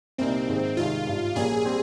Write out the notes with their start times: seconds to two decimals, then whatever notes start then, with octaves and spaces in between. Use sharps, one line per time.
0.18 C2 A#2 G3 A#3 C4 D#4
0.48 G#2 D#3 G#3
0.77 C2 C3 D#3 G#3 F4
1.06 G#1 G2 G3
1.36 A#1 A#2 G3 A#3 C#4 G#4
1.65 G3 C4